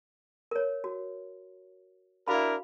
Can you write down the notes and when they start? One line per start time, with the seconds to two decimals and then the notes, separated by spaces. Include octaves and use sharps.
0.51 A#4 C#5
0.84 F#4
2.28 D4 E4 F#4 A#4 F5 B5